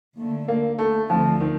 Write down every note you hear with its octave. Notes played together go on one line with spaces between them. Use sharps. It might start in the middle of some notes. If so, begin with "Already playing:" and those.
D#2 D3 A3
A#3
A3
D2 D3 F3 A3 C4
D#3